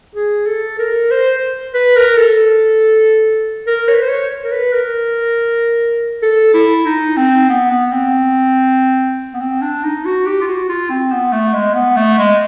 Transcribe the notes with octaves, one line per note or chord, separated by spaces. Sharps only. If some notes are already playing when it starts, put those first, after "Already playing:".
G#4
A4
A#4
C5
B4
A#4
A4
A#4
C#5
B4
C5
C#5
A#4
B4
A#4
A4
E4
D#4
C4
B3
B3
C4
B3
C4
D4
D#4
F#4
G4
F4
F#4
F4
C4
B3
A3
G#3
B3
A3
G#3